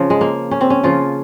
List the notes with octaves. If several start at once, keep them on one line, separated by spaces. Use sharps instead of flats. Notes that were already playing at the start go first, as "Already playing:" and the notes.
Already playing: C#3 F3
G#3
A#3
C#4
C4
C#4
C#3 F3 F4